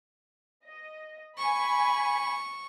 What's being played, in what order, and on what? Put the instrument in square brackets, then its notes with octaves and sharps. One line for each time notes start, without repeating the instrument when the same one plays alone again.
[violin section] D#5
[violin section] G#5 B5 [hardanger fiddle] C#6